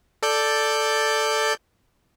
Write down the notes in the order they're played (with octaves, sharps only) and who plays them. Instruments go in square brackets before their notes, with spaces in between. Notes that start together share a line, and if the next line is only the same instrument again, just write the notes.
[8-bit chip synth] A4 D5 G6